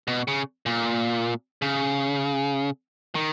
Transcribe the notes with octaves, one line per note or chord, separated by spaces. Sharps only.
B2
C#3
A#2
C#3
D#3